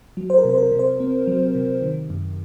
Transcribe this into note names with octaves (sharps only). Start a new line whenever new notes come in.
F#3
C5
A#4
C3 C5
A#4
C3
C5
C4
F#3
C3
D#3
F#2